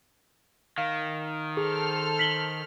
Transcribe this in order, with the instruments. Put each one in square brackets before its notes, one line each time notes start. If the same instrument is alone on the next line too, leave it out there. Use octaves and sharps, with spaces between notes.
[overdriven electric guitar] D#3 [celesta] F5
[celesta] G#4 [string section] A4 C5 F6
[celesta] B6 F#7 G7